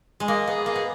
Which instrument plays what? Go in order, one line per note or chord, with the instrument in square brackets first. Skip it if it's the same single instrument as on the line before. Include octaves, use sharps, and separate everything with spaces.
[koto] G#3
[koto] A#3 [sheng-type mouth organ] D#5
[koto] B3 [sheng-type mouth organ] G#4
[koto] A#3 [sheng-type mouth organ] G#4
[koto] B3